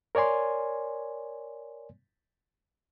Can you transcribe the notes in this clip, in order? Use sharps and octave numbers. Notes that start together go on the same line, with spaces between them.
A#4 C#5 D5 G#5 C6